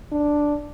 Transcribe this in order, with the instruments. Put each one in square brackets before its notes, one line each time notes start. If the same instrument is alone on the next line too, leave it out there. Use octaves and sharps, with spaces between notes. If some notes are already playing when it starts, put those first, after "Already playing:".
[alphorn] D4